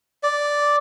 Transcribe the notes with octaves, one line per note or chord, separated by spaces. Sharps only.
D5